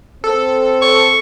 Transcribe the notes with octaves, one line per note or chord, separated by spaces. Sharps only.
C4 A4
C#6